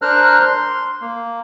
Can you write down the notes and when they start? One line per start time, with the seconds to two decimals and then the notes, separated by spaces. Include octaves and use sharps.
0.02 D4 A#4 C5 A#5 F6 F#6
0.41 C6
1.01 A#3